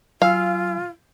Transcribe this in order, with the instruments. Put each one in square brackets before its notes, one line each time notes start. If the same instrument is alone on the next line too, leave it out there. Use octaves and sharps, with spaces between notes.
[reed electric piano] F#3 G#5 E6 [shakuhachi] F4 [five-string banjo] F5